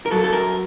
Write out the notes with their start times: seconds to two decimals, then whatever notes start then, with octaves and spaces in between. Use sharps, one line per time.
0.06 A#4
0.11 F#3 A4
0.24 A4
0.33 A#4